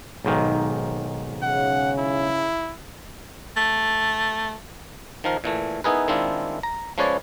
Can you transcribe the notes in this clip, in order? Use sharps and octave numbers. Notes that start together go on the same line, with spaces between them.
B1 G#2 D#3
C#3 F#5
E4
A3
D#3 F3 A#4
A#2 E3 A3
B3 D#4 E4 G#4 A#4 B4
D#3 G#3 C4 D4 E4 F4
A#5
F3 G#3 C#4 B4 C#5 D5